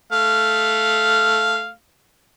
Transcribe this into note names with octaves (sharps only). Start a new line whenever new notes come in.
A3 F5